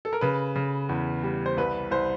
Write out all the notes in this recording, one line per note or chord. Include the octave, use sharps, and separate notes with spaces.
A4
A#4
C#3 B4
C#3
E2
G3
C5
C2 B4
C2 C5